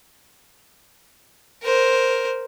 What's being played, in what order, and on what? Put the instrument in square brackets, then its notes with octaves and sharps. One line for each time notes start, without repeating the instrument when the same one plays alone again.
[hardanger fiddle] A#4 C5